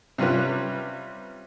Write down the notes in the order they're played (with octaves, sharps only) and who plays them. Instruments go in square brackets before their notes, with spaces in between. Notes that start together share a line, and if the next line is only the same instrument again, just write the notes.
[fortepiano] C3 G3 C#4 F4 B4